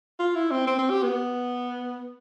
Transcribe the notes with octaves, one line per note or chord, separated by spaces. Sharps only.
F4
E4
C4
C4
C4
G4
B3